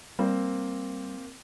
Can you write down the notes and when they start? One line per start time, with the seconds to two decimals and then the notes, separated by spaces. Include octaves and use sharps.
0.19 G3 A#3 C4